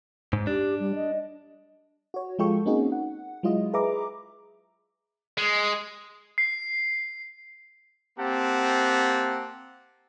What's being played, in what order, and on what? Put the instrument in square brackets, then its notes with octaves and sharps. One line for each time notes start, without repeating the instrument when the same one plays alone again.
[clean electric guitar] G#2
[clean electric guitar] D4 [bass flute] G4
[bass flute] G3
D#5
[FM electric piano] F#4 C#5
F3 G#3 F4 A4 G5 C#6
A#3 C4 C#4 D#4 F#4 G#4
F#5
F#3 G#3 E4 F4 D#5
G#4 B4 D#5 E5 A#5 D6
[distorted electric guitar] G#3
[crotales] C7
[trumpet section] A#3 C4 G4 F#5 A5